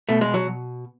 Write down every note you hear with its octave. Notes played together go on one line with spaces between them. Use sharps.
B2 A3
G#3
F#3